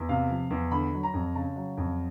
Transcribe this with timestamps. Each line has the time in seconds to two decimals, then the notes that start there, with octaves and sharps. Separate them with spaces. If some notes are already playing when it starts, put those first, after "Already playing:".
Already playing: E2
0.09 C3 F5
0.30 F3
0.50 E2
0.71 D3 B5
0.93 F#3
1.03 A#5
1.13 F2
1.35 C#3 A5
1.56 F#3
1.77 F2